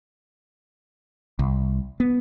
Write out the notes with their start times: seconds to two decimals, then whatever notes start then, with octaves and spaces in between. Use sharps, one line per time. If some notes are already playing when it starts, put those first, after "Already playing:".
1.39 C2
2.00 B3